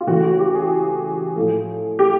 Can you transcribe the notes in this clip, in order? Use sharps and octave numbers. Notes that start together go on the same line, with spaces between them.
F4
C#3 E3 A3 F#4
F#4
G4
G#4
A2 F3 A3
G4